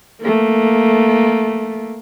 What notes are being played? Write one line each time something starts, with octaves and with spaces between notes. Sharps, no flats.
A3 A#3